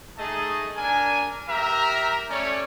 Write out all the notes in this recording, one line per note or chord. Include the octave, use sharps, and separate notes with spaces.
A3 D#4 G#4 D#5 A5
D4 A#4 G#5
G4 A#4 E5 A#5
A3 C#4 C#5 D5